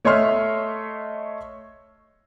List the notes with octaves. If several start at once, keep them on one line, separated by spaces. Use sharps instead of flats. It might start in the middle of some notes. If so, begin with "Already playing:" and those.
A3 C#5 D#5 E5 C6 F6